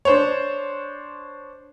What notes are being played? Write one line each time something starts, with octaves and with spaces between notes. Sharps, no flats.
D4 C5 C#5